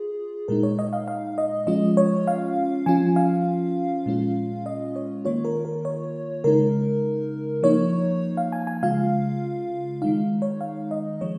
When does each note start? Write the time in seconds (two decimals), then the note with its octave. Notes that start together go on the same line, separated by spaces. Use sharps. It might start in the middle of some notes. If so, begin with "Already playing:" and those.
Already playing: F4 G#4
0.48 A#2 G#3 D#4 A#4
0.63 C#5
0.79 D#5
0.93 F5
1.08 F5
1.38 D#5
1.67 F3 G#3 C#4 F4 D#5
1.97 C#5
2.28 F5
2.86 F3 C#4 F4 G#5
3.16 F5
4.06 A#2 G#3 C#4 F4
4.66 D#5
4.96 C#5
5.25 D#3 A#3 F4 C#5
5.45 A#4
5.65 A#4
5.85 C#5
6.44 C#3 G#3 D#4 A#4
7.63 F3 A#3 D#4 C#5
8.37 F5
8.52 G#5
8.67 G#5
8.83 C#3 G#3 F4 F5
10.02 D#3 G#3 D#4 F5
10.42 C#5
10.61 F5
10.91 D#5
11.21 F3 G#3 C#5